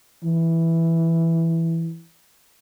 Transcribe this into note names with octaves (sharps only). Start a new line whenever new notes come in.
E3